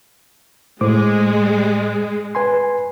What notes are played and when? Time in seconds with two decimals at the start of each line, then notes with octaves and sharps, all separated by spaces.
0.81 A2 G#3 C5 D6
2.35 B4 G#5 C6